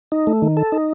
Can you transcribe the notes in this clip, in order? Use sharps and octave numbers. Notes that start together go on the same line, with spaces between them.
D#4
A3
D#3
A4
D#4